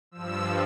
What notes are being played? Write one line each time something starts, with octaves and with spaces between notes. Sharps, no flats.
G2 F3 E6